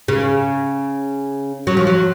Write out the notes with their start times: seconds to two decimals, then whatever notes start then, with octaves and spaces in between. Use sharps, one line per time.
0.08 C#3
1.67 F#3
1.77 F3
1.87 F#3